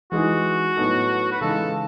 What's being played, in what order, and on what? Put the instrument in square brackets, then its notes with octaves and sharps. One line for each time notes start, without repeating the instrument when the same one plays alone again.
[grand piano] E3 G#3 D#4 G#4 [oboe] F#4
[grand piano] A2 F#3 B3 D#4 A4
[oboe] B4
[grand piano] C#3 E3 G#3 D#4 [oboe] A4